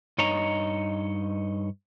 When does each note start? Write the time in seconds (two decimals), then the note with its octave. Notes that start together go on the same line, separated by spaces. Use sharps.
0.18 G2 D#4 C#5 D#5 A#5